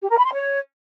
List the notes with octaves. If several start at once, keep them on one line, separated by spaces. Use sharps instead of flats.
G4
A#4
B5
C6
C#5